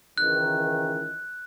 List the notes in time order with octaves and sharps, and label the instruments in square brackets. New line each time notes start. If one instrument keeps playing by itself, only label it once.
[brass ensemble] C#2 D#3 E3 [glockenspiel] F#6